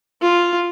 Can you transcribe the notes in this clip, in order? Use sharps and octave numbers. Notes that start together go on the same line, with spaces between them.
F4